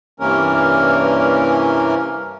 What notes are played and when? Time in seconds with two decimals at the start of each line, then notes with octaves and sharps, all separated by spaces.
0.20 G2 C3 E3 A#3 C#4 A#4